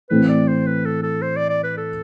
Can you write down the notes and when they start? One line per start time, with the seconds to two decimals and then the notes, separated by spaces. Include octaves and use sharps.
0.10 A2 E3 A3 C4 B4
0.29 D5
0.48 C5
0.67 B4
0.85 A4
1.03 A4
1.22 C5
1.37 D5
1.49 D5
1.64 B4
1.77 A4